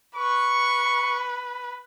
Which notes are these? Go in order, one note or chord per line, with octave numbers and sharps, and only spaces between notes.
B4 C#6